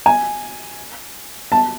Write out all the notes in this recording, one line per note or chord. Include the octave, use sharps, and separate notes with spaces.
G#5
A5